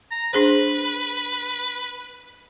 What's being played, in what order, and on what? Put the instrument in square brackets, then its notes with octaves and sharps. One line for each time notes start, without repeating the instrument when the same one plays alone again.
[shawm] A#5
[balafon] D4 G#4 C5 [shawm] B4